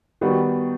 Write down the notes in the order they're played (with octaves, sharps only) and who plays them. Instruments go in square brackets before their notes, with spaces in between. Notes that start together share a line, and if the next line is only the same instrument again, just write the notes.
[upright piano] D#3 G3 B3 D#4 F#4